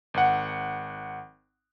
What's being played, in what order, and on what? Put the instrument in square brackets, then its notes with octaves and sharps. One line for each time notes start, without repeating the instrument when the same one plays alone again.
[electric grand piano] G#1 F#5